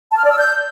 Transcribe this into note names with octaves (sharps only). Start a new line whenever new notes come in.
A5
F6
D5
E6
G6